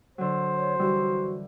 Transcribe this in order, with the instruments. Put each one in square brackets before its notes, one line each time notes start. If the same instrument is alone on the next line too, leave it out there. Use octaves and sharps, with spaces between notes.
[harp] D3 F#3 [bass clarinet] C5
[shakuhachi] C#5
[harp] D3 E3 G3 [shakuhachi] F#4